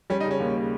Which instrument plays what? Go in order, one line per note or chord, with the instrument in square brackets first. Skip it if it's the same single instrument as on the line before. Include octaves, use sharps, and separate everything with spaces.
[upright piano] G3 [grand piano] C#4
[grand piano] D#4
[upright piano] C#3
[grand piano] C#4
[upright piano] D#2
C#3